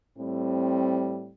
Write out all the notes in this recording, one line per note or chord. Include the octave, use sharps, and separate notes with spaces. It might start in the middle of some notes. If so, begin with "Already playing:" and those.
A2 G3 C4